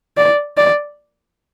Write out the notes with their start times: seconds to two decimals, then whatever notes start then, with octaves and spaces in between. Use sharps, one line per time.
0.17 D5
0.57 D5